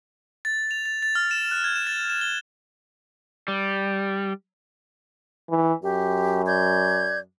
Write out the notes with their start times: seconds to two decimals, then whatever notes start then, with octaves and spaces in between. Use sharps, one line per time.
0.45 A6
0.71 F7
0.86 A6
1.02 A6
1.15 F6
1.31 E7
1.51 F#6
1.64 G#6
1.76 E7
1.87 A6
2.10 E7
2.21 G7
3.48 G3
5.50 E3
5.83 F#2 G4
6.47 D5 G6 G#6